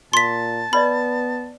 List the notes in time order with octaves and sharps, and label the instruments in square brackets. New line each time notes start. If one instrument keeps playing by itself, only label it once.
[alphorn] A#2 [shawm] A5 [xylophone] C6 B6
[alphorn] B3 [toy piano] B4 D5 D#5 [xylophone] B5